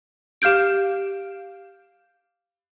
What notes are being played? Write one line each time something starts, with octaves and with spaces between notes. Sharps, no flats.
G4 F5 F6 G6 D7